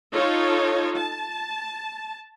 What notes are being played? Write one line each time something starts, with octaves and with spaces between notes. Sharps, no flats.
D#4 F4 A4 C#5
A5